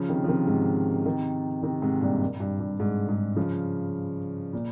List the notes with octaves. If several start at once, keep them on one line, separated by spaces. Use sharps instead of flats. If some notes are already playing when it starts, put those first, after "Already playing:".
Already playing: C#3 F3
C3 D#3
F3
C3 D#3
G#2 C3
C3 D#3
C3 D#3
G#2 C3
G2 A#2
G2
G2
G#2
G#2
C#3 F3
A#2